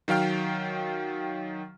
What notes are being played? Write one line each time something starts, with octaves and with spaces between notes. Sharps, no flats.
D#3 F#3 F5 G5 F6